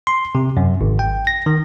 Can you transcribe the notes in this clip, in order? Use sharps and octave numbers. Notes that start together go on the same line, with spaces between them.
C6
C3
F#2
G#1
G5
A#6
D#3